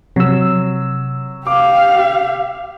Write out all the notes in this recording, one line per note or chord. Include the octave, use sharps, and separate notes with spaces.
C3 F#3 E6
G4 F5 D6